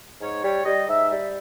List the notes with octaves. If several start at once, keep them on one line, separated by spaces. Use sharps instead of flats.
G#2 C#5
G3 C#5
G3 D#5
G#2 E5
G3 E5